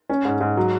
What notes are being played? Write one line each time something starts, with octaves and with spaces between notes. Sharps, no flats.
C#4
G#2
G#2
F#3